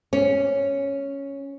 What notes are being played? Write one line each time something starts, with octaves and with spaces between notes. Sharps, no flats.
C#4